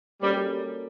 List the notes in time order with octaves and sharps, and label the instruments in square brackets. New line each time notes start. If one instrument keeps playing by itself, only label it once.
[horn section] G3 [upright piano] A#3 C#4 F#4 A4 C#5